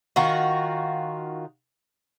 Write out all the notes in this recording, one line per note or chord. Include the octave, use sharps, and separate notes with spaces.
D#3 F4 F#4